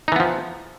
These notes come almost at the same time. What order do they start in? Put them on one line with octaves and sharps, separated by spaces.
D#4 E3 B3 F3